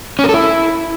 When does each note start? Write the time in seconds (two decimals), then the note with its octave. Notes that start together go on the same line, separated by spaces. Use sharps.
0.19 C#4
0.24 A#4
0.29 A4
0.34 E4